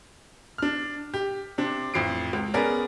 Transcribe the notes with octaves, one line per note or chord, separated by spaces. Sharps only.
D4 F6
G4
C3 D4
A1 F2 C7 D7
C#2
B3 C#4 G#4 A#4 D5